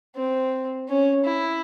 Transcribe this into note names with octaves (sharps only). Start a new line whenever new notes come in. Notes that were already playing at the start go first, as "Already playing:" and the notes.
C4
C#4
E4